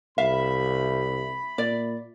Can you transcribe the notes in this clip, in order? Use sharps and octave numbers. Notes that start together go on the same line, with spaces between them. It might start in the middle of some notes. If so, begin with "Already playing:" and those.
C2 E5 F5 B5
A#2 D5